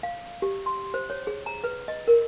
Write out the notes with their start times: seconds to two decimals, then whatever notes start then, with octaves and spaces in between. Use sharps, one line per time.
0.03 F5
0.42 G4
0.66 C6
0.94 C5
1.10 C#5
1.27 G#4
1.46 A#5
1.64 B4
1.88 D#5
2.08 A#4